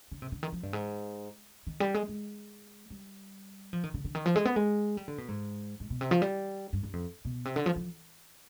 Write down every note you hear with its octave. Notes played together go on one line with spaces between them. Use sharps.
D3
C3
D3
D#3
F3
G2
G#2
D#3
G3
G#3
G#3
G3
F3
D#3
D3
D3
D#3
F3
G#3
B3
G#3
G3
D3
B2
G#2
G#2
B2
C3
F3
G3
G2
G2
F2
B2
C3
D3
F3
F3